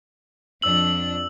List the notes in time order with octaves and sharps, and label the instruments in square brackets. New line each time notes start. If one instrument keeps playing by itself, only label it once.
[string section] F2 D4 [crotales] E6 F#7